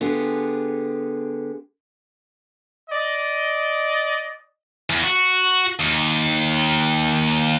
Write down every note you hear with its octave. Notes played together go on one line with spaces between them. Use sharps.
D3 B3 F4 G4 G#4
D5 D#5
E2
F#4
D#2